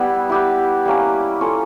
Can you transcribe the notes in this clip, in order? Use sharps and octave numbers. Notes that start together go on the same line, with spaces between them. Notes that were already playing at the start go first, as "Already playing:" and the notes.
Already playing: G3 B3 E4
E4 G4 B4
G3 A#3 C#4
C#4 F4 A4 C#5